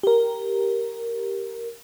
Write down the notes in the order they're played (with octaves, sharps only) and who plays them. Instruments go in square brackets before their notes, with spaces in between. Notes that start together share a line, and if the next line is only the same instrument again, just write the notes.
[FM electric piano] G4 A#4